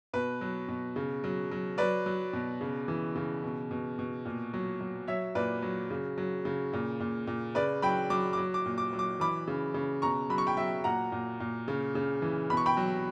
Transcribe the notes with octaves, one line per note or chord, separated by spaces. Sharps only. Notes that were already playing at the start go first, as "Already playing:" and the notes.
B2 B4
F#3
B2
C#3
F#3
F#3
F#3 B4 D5
F#3
B2
C#3
E3
C#3
B2
B2
B2
A#2
F#3
F#3
F#3 C#5 E5
A#2 B4 D5
F#3
C#3
F#3
C#3
A#2
A#2
A#2
C#3 B4 D5
F#3 G5 B5
F#3 D6
F#3 D6
D6
A#2
D6
F#3
D6
E3 B5 D6
C#3
C#3
B2 A#5 C#6
F#3 B5
C#6
G5 B5
F#3 E5 G5
A#2 F#5 A#5
A#2
A#2
C#3
C#3
E3
B2 B5
C#6
G5 B5
F#3